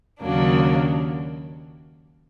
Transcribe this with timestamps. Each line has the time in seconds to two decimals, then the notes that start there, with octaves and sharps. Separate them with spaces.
0.21 D#2 C#3 F#3 A#3 D4